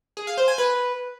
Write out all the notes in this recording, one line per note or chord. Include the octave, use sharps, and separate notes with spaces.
G#4
F5
C5
G#5
B4